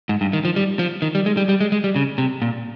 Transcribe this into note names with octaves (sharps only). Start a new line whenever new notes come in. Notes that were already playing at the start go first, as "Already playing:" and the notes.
G#2
G2
D#3
F3
G3
F3
D#3
G3
G#3
G3
G3
G#3
G#3
G3
C#3
C3
A#2